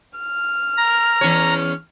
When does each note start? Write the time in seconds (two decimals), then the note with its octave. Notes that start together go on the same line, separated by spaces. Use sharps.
0.19 F6
0.77 A#5
1.21 E2 C#4 C#5